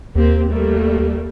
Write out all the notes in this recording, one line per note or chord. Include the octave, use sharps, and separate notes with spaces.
D#2 A#3 C4 G4
G3 A3 A#3